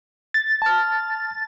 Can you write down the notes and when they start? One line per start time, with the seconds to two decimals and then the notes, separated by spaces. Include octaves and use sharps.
0.34 A6
0.62 A5 F6